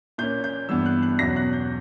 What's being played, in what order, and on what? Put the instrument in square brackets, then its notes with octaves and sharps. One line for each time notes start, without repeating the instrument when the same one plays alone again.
[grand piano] A#2 A#3 C#4 G6
G6
G2 E3 B3 E6
F#6
F#6
E2 B2 F#3 C#4 A#6
F#6
G6